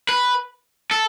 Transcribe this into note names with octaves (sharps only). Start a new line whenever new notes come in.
B4
A4